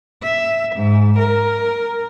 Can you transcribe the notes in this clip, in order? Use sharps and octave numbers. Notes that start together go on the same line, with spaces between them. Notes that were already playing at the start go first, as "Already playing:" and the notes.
E5
G#2
A#4